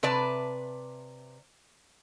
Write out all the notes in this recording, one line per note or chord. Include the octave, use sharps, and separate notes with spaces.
C3 B4 D5 A5